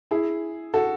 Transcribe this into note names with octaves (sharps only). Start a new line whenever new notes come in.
E4 G#4
F#4 A4